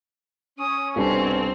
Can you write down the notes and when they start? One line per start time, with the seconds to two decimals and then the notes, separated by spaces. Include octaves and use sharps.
0.58 C#4 D#6
0.96 C2 G#2 B2 C4 D4 A4